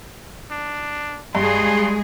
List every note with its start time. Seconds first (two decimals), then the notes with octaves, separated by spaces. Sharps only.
0.51 D4
1.35 G2 G#3 G#4 C6